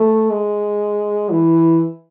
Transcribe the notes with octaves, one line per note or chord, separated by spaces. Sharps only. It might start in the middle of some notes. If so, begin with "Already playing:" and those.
Already playing: A3
G#3
E3